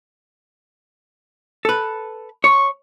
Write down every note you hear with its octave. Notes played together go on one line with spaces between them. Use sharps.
A4 B4
C#5 C#6